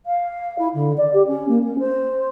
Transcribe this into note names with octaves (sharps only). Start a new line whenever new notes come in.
F5
E4
D3
D5
G4
C#4
A#3
C#4
C5